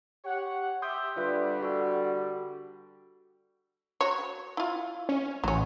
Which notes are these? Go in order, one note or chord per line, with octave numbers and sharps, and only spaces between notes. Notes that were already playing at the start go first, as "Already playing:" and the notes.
G4 C#5 F#5
G4 E5 C6 D#6 G6
D3 G3 F4 B4 E5
F#4 A4
F#4 C#5
E4 F4
C#4
A1 F#3 C#4